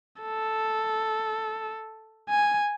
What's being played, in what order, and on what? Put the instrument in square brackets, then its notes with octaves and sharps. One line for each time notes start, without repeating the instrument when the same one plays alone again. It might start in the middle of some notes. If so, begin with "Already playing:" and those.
[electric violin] A4
G#5